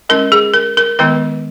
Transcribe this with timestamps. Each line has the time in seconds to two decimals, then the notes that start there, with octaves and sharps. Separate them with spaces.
0.09 G#3 C#4 E4 A#4
0.32 G#4
0.54 A#4
0.77 A#4
0.99 D#3 G#3 B3 E4 B4